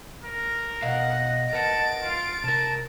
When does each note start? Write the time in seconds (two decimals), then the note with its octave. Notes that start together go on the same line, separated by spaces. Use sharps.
0.23 A#4
0.82 B2 D#5 F5 F#5
1.53 A#4 B4 F#5 A5 A6 D7
2.02 F4
2.44 C3 A#4 A5